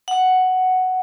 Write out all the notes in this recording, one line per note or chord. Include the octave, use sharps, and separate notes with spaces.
F#5